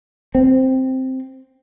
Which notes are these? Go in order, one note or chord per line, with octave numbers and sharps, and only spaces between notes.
C4